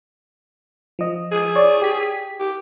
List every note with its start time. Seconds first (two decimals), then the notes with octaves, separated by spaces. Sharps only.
0.99 F3 D#5
1.32 G#4
1.56 C#5 D5
1.82 G4 B6
2.40 G4